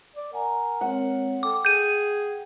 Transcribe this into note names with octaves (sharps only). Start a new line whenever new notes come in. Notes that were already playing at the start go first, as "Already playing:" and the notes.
D5
A#4 F#5 G#5 A#5
G#3 C4 C#5 F#5
A4 G5 D6
G#4 G6 D#7